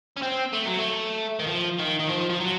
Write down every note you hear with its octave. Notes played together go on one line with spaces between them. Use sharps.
C#4
C4
A3
F#3
A3
D#3
F3
D#3
D#3
F3
F3
F#3